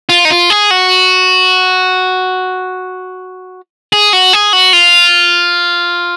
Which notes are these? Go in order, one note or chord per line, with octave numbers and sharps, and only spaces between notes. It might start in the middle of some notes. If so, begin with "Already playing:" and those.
F4
D#4
F4
G#4
F#4
G#4
F#4
G#4
F#4
F4